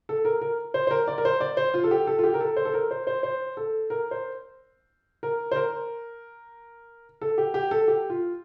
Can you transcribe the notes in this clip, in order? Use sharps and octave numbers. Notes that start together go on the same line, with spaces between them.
A4
A#4
A#4
C5
C5
A#4
D5
A#4
C5
D5
C5
F4
A4
G4
A4
F4
G4
A#4
A4
C5
A4
A#4
C5
C5
C5
A4
A#4
C5
A#4
C5
A#4
A4
G4
G4
A4
G4
F4